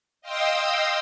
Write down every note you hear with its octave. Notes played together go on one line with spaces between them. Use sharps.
D#5 F5 G5 C6 D#6 E6